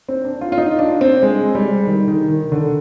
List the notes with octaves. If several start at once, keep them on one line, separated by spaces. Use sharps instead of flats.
C4
D4
F4
F4
D#4
D4
C4
G#3
G3
D#3
D#3
D#3
D3